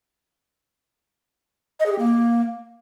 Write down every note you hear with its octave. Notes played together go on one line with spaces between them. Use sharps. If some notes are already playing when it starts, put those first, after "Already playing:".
D#5
G#4
G4
A#3